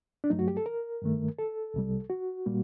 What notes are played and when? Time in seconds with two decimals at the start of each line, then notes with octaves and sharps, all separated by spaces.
0.24 D4
0.30 G2 F#3 A3 D#4
0.39 F#4
0.48 G4
0.57 A4
0.66 A#4
1.02 G2 D#3 A3
1.38 A4
1.74 C2 C3 G3
2.10 F#4
2.46 A#2 G3 A#3